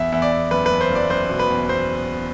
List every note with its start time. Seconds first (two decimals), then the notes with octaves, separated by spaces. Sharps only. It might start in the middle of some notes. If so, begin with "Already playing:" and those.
Already playing: E2 E5
0.12 E2 E5
0.22 D5
0.32 E2
0.51 F#1 B4
0.66 B4
0.71 F#1
0.81 C5
0.91 F#1 D5
1.10 F#1 C5
1.30 B2
1.39 B4
1.49 E2
1.69 E2 C5